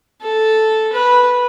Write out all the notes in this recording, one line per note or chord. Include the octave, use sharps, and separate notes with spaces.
A4
B4